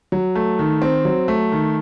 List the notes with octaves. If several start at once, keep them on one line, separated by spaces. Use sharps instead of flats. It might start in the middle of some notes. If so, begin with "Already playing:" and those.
F#3
A3
D#3
C4
F#3
A3
D#3